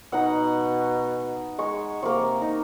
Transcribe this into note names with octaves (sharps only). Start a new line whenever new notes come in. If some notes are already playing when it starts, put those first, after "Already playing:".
B2 D#4 F#5
G#3 C#6
C3 A#3 C#6
D#4